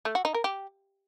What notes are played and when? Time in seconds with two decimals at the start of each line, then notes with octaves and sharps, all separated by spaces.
0.05 A3
0.15 F#4
0.25 D#4
0.34 A#4
0.44 G4